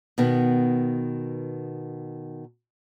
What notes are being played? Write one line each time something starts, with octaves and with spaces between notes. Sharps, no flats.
B2 D#3 B3